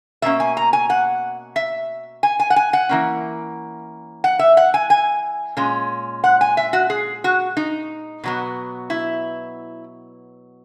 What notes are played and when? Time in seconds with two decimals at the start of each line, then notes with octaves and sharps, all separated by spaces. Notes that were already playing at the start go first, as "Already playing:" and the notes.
0.22 B2 A#3 C#4 E5
0.40 G#5
0.57 A#5
0.73 G#5
0.90 F#5
1.56 E5
2.23 G#5
2.40 G#5
2.50 F#5
2.56 G#5
2.73 F#5
2.89 E3 A#3 C#4
4.24 F#5
4.39 E5
4.57 F#5
4.74 G#5
4.90 G#5
5.57 A#2 G#3 C#4
6.24 F#5
6.41 G#5
6.57 E5
6.73 F#4
6.90 G#4
7.24 F#4
7.57 D#4
8.24 B2 F#3 B3
8.90 E4